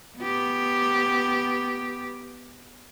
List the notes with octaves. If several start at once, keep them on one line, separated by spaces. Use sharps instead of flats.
B3 G4